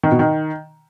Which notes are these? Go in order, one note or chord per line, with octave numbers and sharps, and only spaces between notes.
D#3
B2
D#3